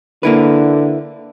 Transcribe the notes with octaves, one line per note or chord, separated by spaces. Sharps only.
D3 A#3 E4 B4